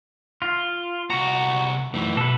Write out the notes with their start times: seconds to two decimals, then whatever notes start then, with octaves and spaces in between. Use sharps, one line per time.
0.42 F4
1.10 C2 F#4 A#5
1.94 F#2 E3 A3
2.17 B2 A4 B4